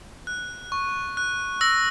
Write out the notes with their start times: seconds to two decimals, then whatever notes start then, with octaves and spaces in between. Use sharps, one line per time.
0.27 F#6
0.72 C#6
1.17 F#6
1.61 E6 A#6